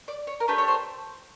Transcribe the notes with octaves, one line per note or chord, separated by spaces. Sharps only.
D5
C#5
A#4
A3 D4 G4 B4
C#5
C5